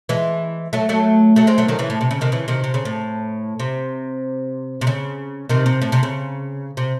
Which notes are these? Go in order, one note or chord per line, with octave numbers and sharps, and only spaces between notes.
E3 G#3
F#3 A3
F#3 A3
F#3 A3
G#3 C4
F#3 A3
D#3 F#3
C#3 E3
A2
C3
C#3
C3 D#3
C#3 E3
C3 D#3
C3
C#3
A2
C3
C3
C#3
C3 D#3
C3
A2
C3
C#3
C3